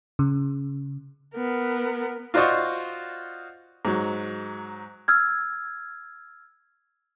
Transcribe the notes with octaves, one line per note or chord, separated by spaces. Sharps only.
C#3
B3 A#4
F4 F#4 C5 D5 D#5 C#6
G#2 F#3
E6 F6 G#6